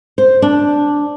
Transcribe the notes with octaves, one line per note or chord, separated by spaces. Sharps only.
C5
D4